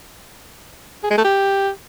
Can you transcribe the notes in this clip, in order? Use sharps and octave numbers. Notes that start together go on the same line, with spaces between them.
G#4
G#3
A3
G4